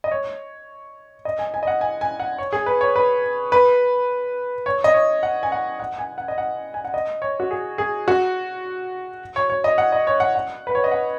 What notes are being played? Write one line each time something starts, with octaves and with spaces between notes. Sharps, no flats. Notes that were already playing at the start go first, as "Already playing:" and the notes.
D#5
C#5
D#5
G#5
G#5
D#5
F#5
G#5
G#5
F#5
C#5
G#4
B4
C#5
B4
B4
C#5
D#5
C#5
F#5
G#5
F#5
F#5
G#5
F#5
D#5
F#5
G#5
F#5
D#5
C#5
F#4
G#4
G#4
F#4
C#5
C#5
D#5
F#5
D#5
C#5
F#5
F#5
B4
C#5
D#5
F#5